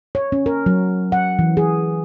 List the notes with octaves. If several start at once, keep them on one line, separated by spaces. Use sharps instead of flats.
C#5
C#4
A#4
F#3
F#5
E3
G#4